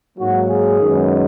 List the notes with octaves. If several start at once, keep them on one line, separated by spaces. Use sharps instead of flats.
G#2 F#3 A#3 F#4
G#4
F#2 D#3 G#3 B3